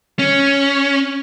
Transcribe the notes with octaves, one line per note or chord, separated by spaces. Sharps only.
C#4